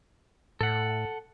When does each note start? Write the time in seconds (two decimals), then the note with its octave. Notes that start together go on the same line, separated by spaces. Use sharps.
0.61 A2 A4 F#5